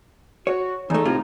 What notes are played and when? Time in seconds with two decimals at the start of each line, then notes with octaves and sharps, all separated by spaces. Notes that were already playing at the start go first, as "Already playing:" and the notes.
0.47 F#4 C#5
0.90 E2 A3 D#4
1.05 A2 C3 F4